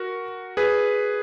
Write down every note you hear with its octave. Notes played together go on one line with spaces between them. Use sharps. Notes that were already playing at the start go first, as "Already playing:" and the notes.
Already playing: F#4 A#4
G#4 B4